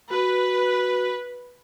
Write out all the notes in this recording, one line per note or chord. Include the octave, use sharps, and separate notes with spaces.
F#4 B4